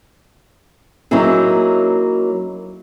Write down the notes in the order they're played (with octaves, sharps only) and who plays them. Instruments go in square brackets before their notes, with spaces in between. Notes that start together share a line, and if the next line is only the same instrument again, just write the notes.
[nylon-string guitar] F#3 A#3 C#4 D#4 E4 G#4